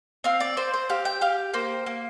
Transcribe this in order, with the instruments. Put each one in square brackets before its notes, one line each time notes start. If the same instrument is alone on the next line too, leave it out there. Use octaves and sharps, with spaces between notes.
[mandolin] C4 F5
D5
C4 C5
C5
G4 F5
G5
G4 F5
A#3 C5
A#3